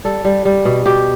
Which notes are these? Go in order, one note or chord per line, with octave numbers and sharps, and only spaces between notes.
G3 A4
G3
G3
B2
B2 G4